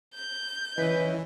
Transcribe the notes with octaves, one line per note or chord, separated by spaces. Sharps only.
G6
E3 C#4 E4 B4 D#5